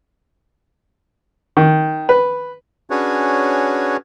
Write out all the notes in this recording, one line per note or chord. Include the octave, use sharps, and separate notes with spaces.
D#3
B4
C#4 D4 F#4 G#4 B4 C#5